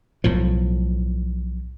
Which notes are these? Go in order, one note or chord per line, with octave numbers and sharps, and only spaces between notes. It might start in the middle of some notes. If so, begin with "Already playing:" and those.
B1 A2 F3